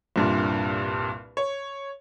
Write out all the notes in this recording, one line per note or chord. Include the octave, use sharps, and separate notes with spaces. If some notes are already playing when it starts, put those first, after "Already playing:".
C2 G2 A#2
C#5